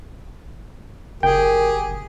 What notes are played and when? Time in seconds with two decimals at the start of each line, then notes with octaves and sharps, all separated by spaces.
1.23 F#1 G4 G#4 A#4 G5